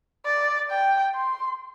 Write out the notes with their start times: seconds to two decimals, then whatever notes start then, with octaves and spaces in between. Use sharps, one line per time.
0.26 D5
0.70 G5
1.14 C6